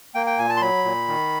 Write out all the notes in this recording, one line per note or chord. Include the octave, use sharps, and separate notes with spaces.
A#3 G5
G5
A#2 G#5
A5
C6
F#3 B5
A#2
D#3